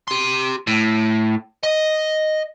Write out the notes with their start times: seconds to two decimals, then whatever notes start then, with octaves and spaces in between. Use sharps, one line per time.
0.08 G4 C6
0.67 A2
1.63 D#5